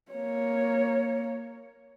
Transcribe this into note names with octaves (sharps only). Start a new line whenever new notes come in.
A#3 C#5